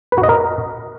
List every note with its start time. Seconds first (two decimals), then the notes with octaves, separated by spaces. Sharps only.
0.12 B4
0.18 F#4
0.23 D#5
0.29 A#4